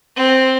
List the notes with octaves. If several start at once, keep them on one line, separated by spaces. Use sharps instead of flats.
C4